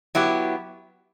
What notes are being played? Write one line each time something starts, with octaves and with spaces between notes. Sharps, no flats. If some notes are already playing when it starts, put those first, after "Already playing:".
F#3 B3 E4 G4